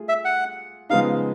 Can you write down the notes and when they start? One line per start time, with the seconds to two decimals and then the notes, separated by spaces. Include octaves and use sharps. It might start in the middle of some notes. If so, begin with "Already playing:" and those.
Already playing: A3 F4 G#4
0.09 E5
0.25 F#5
0.90 C#3 F3 G#3 B3 D#4 F5